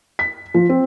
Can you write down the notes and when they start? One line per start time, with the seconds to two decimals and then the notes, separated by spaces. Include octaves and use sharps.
0.19 B6
0.54 F3
0.69 C4